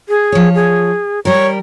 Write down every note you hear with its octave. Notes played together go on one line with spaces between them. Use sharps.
G#4
F3 C#5
G#4
G3 A#4 C#5